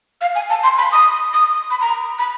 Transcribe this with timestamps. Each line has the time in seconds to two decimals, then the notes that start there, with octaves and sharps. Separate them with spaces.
0.21 F5
0.35 G#5
0.49 A5
0.63 C6
0.77 B5
0.92 D#6
1.33 D#6
1.70 B5
1.80 A#5
2.18 B5